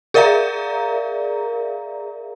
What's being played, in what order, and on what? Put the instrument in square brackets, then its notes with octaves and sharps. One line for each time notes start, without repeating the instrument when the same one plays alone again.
[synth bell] G#4 A#4 D5 E5 F5 A#5